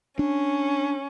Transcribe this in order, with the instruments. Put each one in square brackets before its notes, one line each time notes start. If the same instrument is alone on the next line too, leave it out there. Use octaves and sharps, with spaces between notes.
[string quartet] C#4 [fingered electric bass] D4